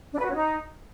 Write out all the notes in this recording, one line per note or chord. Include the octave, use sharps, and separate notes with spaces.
D4
B4
F#4
C#4
D#4